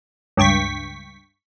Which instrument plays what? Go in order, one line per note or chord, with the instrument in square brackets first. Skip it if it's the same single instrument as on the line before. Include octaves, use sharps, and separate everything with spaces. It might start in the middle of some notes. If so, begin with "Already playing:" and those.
[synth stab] C#2 G2 G5 C#6 B6